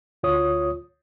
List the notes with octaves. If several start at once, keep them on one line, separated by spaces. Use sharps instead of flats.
D2 F4 C#5 D#6